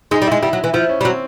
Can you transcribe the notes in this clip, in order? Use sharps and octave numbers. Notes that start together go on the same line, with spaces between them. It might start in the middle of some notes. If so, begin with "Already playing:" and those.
G#3 D#4
G3
G#3 E4
G3 E4
F#3
E3
F3 E4
C#4
G3
F#3 C4